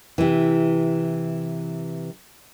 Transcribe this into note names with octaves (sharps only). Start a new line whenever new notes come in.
C3 E3